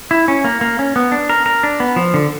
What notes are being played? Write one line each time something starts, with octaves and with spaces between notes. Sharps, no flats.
E4
C#4
A#3
A#3
C#4
B3
D4
A#4
A#4
D4
B3
F3
D3